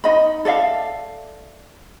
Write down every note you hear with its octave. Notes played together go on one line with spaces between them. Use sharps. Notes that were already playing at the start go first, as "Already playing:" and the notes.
D#4 D#5 B5
A4 D5 E5 F5